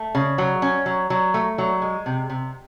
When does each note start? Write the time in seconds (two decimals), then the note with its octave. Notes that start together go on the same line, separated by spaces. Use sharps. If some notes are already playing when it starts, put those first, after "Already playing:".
Already playing: A3
0.15 C#3
0.38 F#3
0.62 C#4
0.86 F#3
1.10 F#3
1.34 A3
1.58 F#3
1.82 G#3
2.06 C3
2.30 C3